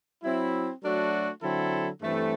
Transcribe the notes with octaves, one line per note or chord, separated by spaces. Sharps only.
F#3 C4 E4
F#3 A3 D4 F#4 A4
D3 F#3 C4 E4 A4
G2 E3 A3 C4